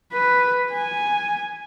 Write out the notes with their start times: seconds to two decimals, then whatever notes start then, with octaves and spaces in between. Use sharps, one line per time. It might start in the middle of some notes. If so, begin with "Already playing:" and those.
0.13 B4
0.72 G#5